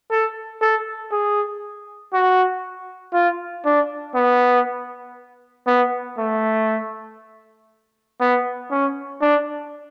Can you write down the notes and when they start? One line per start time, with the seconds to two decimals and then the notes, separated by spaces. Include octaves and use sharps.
0.11 A4
0.61 A4
1.12 G#4
2.13 F#4
3.14 F4
3.65 D4
4.15 B3
5.67 B3
6.18 A3
8.21 B3
8.71 C#4
9.21 D4